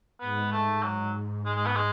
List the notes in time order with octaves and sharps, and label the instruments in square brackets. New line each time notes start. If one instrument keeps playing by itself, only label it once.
[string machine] G#2 [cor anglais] B3
[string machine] G#2 [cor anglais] A3
[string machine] G#2 [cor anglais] F#3
[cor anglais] G#3
G#3
B3
G#3